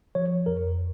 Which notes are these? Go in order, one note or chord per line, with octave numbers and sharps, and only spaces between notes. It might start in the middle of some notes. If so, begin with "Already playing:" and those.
F3 C#5
F2 A#4